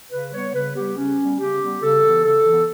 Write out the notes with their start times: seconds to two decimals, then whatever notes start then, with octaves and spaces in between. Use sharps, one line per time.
0.11 C#3 B4
0.33 G3 B3 C#5
0.54 C#3 B4
0.76 G3 B3 G4
0.97 C#3 C#4
1.18 G3 B3
1.39 C#3 G4
1.60 G3 B3
1.82 C#3 A4
2.04 E3 B3
2.24 C#3 A4
2.46 E3 B3